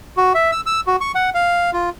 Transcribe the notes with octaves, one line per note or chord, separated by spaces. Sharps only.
F#4
E5
E6
E6
F#4
C#6
F#5
F5
F4